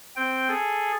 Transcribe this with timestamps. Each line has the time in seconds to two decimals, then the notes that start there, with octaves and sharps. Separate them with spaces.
0.16 C4 G5
0.48 G#4 A4